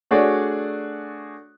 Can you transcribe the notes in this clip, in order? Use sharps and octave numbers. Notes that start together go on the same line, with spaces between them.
A3 D4 F#4 G#4 C#5 D5